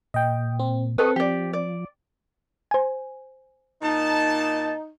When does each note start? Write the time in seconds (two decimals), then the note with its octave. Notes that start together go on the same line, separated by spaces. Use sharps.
0.14 A#2 D#5 G5
0.59 C4
0.98 C4 A4 B4 D#5 C#6 D#6
1.16 F3 G4 D5
1.53 D5
2.71 C5 G#5
3.82 A#2 A#3 D#4 A5